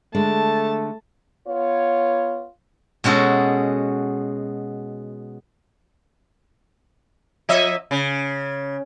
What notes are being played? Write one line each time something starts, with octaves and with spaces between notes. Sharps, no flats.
D3 G#3 A3 D4 A5
B3 F4 C#5
B2 G#3 C#4 F#4 A4
F3 D#5 E5
C#3